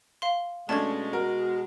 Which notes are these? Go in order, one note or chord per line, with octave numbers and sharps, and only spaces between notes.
F5 C6
B2 G#3 A3 C#4 D4 A5 G#6
F#4 A#4